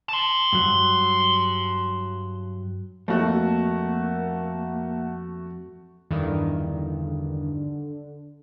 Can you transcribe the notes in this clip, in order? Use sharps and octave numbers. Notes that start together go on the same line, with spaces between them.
A5 C6
G2 F#3
F2 A3 A#3 F#4 E5 F#5 A5
E2 G2 D3 D#3